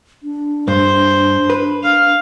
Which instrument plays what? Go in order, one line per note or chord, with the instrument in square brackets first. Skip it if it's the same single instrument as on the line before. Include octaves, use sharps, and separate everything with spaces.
[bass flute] D4
[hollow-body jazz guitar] G2 [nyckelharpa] C5
[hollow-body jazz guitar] B4
[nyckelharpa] F5